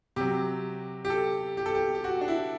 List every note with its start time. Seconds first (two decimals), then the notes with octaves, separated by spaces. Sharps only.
0.16 C3 F#3 G4
1.05 G4
1.10 A4
1.57 G4
1.66 A4
1.75 G4
1.95 G4
2.04 F#4
2.21 D4
2.28 E4